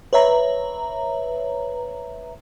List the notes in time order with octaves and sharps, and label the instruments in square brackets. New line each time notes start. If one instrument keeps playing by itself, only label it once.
[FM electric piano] B4 C#5 E5 A#5